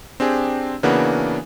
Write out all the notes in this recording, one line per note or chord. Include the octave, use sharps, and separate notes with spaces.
C4 D4 G4 G#4
C#3 E3 A#3 B3 D4 F#4